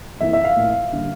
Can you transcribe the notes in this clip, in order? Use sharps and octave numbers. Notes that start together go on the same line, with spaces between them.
F2 E3 A#3 E5
E5
F5
A2 F3 A#3
D3 G3 A#3